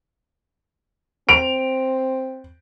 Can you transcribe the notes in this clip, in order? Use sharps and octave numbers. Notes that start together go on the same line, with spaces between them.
C4 D7 F7